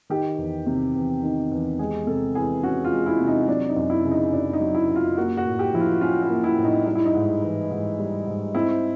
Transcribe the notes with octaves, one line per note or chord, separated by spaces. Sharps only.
D#3 G4
E2
C3
E2
D#3
E2
G#3 G#4
C3 A4
E3 G#4
C#4 F#4
F4
G#3
E4
C3
D#4
F#3 D4
D#4
F#2
E4
C#3
D#4
F#2 D4
D#4
F#3
E4
F#2
F4
A#3 F#4
F#4
A2
G4
F3 E4
F4
C#4 F4
E4
A#3
E4
A2
D#4
G3 D#4
E4
D#4
G#2
E3
G#2
G3
G#2
C4 E4